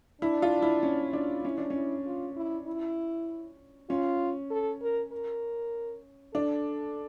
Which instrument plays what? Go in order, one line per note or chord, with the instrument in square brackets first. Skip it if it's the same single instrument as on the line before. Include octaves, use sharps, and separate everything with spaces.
[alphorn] D4 [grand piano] E4
[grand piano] F4
E4
C#4
D4
[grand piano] C#4 [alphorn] E4
[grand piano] D4
[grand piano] C#4 [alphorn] E4
[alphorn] F4
E4
E4
[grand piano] C#4 [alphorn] F4
[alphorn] A4
A#4
A#4
[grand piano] D4 [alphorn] A4